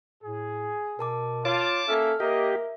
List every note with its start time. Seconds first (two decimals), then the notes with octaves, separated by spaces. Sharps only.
0.24 A2 G#4
0.99 B2 A#4 A5 D6
1.45 F4 C#5 A5 D6
1.88 A#3 C#4 A4 E5 F6
2.20 A#3 G4 A#4 D#5 E5